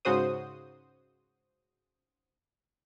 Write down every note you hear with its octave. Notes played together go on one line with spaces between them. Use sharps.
G#2 C#3 F#4 C5 D#6